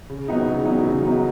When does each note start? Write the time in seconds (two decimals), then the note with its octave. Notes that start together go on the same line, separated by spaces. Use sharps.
0.10 C#3
0.28 F#3 B3 D#4
0.47 C#3
0.65 F#3 B3 D#4
0.83 C#3
1.02 F#3 B3 D#4